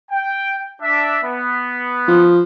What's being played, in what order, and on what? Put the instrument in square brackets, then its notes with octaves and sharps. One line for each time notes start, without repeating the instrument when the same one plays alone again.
[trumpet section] G5
D4 E5
B3
[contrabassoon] F3